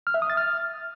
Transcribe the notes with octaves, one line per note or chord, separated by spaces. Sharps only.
F6
E5
D#6
A6
F6